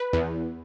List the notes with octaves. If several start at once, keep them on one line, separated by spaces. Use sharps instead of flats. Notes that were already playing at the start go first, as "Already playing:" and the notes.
Already playing: B4
E2